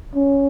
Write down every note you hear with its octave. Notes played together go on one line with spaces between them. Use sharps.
C#4